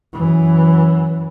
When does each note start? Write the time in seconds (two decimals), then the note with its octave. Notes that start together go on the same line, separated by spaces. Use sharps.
0.13 F#2 E3